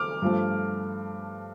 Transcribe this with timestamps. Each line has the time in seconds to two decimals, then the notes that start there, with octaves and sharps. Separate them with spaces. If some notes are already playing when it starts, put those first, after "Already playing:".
Already playing: D6 F6
0.22 G2 F3 A3